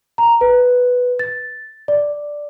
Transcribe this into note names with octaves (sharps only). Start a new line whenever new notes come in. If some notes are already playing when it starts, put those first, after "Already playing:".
A#5
B4
A6
D5